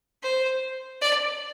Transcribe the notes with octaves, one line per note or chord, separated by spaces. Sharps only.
C5
D5